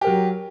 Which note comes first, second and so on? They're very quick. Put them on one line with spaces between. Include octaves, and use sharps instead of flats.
G4 A#4 F#3